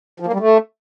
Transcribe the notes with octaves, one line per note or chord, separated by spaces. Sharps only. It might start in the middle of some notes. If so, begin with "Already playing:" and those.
F3
A#3
G3
A3